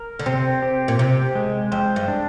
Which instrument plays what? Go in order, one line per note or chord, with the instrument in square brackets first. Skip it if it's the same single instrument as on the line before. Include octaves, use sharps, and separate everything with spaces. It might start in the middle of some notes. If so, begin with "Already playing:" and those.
Already playing: [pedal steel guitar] A#4
[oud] D3
[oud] C3 [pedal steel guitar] C4
[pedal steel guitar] G4
[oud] A#2
[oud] C3 [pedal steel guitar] G4
[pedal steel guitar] G#3
[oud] F2 [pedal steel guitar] C5
[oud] G2
[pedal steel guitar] D4